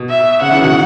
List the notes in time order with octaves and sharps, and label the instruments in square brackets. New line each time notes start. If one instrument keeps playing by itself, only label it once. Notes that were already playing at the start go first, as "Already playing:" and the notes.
Already playing: [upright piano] B2
[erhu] E5
[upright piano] C#3 [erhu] F#5
[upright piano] C#3 E3
B2 D#3